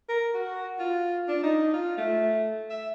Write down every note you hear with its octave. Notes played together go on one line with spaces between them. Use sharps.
A#4
F#4
F4
D4
D#4
F4
A3
E5